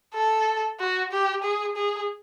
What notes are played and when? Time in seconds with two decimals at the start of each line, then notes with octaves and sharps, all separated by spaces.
0.14 A4
0.80 F#4
1.12 G4
1.43 G#4
1.76 G#4